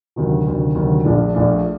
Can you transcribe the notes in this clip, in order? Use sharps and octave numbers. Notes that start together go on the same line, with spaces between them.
D2 C3 D#3 F#3
D2 C3 D#3 F#3
D2 C3 D#3 F#3
A#1 A#2 A3 D4
A#1 A#2 A3 D4